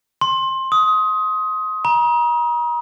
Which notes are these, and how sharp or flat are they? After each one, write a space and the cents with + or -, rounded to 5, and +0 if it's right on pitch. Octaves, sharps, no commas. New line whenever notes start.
C6 +20
D#6 +20
A#5 +40